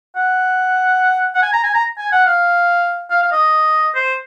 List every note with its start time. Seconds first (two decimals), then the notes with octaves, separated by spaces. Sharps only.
0.16 F#5
1.35 F#5
1.43 G#5
1.53 A#5
1.64 G#5
1.74 A#5
1.98 G#5
2.12 F#5
2.26 F5
3.10 F5
3.23 F5
3.32 D#5
3.95 C5